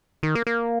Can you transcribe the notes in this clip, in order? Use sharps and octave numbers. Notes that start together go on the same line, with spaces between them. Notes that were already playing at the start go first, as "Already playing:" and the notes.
D#3
A#3
A#3